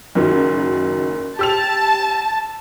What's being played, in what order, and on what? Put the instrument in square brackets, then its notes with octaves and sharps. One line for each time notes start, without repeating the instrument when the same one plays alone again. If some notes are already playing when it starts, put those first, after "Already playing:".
[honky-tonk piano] F#1 D#3 F#3
[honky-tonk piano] G4 E6 F7 [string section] A5